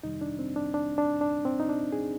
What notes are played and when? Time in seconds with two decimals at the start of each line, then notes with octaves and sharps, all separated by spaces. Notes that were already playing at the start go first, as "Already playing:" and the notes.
0.03 F2 C3 D#3 G3 D#4
0.21 D4
0.39 C4
0.56 D4
0.74 D4
0.98 D4
1.21 D4
1.45 C4
1.60 D#4
1.69 D4
1.92 G#4